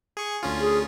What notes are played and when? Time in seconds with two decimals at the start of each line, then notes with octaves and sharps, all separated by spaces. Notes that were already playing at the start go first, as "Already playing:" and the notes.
0.17 G#4 C#6
0.43 D2 C#4 F4
0.60 G#4